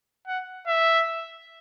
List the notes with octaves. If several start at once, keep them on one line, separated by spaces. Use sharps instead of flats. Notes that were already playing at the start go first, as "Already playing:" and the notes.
F#5
E5